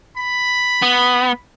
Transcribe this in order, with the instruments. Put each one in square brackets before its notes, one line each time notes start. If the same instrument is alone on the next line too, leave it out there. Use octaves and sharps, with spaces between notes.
[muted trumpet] B5
[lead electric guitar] B3